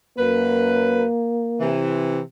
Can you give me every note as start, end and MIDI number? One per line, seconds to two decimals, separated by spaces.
0.19 1.04 42
0.19 1.69 58
0.19 1.04 71
1.60 2.21 48
1.60 2.21 52